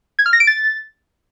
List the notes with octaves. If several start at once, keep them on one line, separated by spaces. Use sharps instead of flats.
G#6
F6
A#6
D7
A6